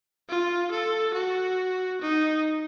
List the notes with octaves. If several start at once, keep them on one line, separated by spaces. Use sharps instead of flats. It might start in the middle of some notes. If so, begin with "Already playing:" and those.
F4
A4
F#4
D#4